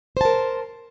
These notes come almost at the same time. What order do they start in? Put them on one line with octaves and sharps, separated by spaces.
C5 A5 A#4